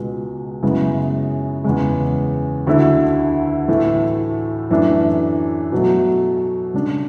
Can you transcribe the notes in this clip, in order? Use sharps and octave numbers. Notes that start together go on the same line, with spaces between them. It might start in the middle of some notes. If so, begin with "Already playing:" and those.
Already playing: C#2 B2 G#3 B3
F#2 C#3 G#3 B3 E4
E2 C#3 G#3
D2 D3 A3 E4
A2 E3 A3
F#2 E3 A3 D4
B2 F#3 A3
C#3 G#3 D4